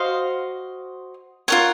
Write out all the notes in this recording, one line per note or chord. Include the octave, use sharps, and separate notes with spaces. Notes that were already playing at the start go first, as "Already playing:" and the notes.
Already playing: F#4 C5 D#5 F5
F4 A#4 C#5 F#5